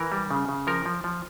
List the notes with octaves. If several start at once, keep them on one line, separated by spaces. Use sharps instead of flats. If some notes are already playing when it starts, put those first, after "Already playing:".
Already playing: E3 A#4
G3
C#3
C#3
F3 A#4
F3
F3